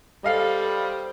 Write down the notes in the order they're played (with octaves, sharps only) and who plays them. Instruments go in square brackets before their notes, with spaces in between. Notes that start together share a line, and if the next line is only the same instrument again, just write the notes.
[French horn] G3 [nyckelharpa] A4 C5 [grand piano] D#5 F5 C7
[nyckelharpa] C5